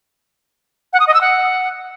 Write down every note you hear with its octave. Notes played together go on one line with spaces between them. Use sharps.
F#5
D#6
D#5
E6
F#5